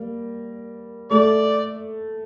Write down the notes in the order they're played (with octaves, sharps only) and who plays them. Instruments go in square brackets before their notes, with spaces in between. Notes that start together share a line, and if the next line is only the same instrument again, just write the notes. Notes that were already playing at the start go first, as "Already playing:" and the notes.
Already playing: [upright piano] G3 A#3
[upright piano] A3 [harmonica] D5